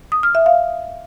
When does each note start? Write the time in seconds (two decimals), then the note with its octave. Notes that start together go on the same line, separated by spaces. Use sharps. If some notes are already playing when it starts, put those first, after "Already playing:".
0.12 D#6
0.23 F6
0.35 E5
0.46 F5